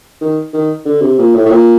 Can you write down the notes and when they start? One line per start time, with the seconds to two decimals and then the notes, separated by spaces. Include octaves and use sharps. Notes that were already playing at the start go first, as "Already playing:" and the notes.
0.21 D#3
0.53 D#3
0.85 D3
1.02 C3
1.18 A#2
1.35 A2
1.45 A2
1.50 A#2